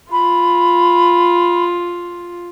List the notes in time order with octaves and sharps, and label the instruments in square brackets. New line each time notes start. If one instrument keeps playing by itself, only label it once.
[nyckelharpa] F4 [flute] B5